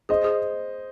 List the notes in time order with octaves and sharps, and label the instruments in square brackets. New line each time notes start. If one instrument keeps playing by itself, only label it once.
[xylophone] G#4 [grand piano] C5 D#5
[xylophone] G#4